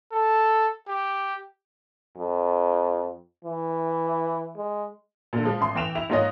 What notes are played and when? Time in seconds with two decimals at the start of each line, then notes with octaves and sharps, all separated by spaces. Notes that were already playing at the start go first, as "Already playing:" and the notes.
0.13 A4
0.88 G4
2.17 F2
3.44 E3
4.56 G#3
5.33 A#2 D3
5.45 F3 G#3
5.61 A1 C6
5.75 E3 G5 E7 F7
5.95 E4 F7
6.09 G#2 A#3 F4 C#5 D#5